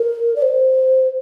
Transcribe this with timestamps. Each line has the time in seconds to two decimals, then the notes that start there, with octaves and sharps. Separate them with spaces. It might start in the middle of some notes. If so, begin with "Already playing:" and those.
Already playing: A#4
0.36 D5
0.42 C5